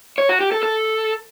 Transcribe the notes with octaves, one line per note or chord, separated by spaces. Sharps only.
C#5
F#4
G4
A4
A4